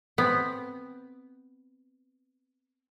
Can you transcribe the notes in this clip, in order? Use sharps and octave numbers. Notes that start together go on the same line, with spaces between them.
B3 C4